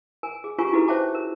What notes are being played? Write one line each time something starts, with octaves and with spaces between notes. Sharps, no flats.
A#4 G#5
G#4
C#4 F4 G4 A#4 G#5 C#6
D#4 E4 F#4 G#4 A4 B4
C5 C#5 E5 G5 A5 D6
A#4